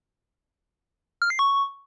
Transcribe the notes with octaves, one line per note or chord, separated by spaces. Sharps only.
F6
C7
C#6